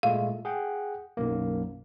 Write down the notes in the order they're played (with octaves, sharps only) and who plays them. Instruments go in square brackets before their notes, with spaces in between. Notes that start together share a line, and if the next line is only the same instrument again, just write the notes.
[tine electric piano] A#2 G#3 A3 [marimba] F5
[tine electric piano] G#4 F#5 G5
B1 F#2 A#3